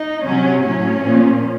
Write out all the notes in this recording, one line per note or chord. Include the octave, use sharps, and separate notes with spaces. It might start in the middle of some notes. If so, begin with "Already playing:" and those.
Already playing: D#4
C3 F#3 C#4
A2 F#3 C#4
A#2 F3